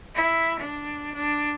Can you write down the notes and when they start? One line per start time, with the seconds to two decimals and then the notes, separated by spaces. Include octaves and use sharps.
0.15 E4
0.60 D4
1.14 D4